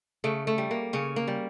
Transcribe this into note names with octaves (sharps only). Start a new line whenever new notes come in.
C#3 A3
A3
G3
A#3
C#3 C#4
A#3
G3